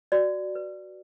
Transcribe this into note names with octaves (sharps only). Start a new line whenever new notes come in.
F#4 D5
B4